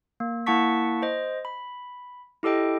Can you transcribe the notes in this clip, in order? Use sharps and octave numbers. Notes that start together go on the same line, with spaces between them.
A#3
A#3 E4 F#5 A5 C#6 B6
C5 D#5
B5
E4 G4 A4 D#5 G5